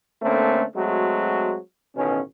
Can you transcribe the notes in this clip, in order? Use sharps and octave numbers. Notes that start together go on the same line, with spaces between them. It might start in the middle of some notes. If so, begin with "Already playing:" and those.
D3 A3 A#3 C4 C#4
F#3 G#3 A3 C4 F#4
A1 B2 D#3 C#4